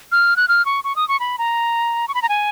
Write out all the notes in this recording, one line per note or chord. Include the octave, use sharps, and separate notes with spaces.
F6
F#6
F6
C#6
C#6
D#6
C#6
B5
A#5
C#6
B5
A#5
G#5